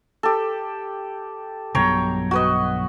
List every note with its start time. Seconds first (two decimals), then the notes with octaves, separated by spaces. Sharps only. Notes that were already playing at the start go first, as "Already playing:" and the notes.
0.23 G4 A4
1.75 B1 G2 B2 C#5 G5 A#5
2.31 F#4 B4 D#5